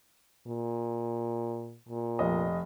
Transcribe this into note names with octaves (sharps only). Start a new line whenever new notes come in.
A#2
A#2
F1 D#5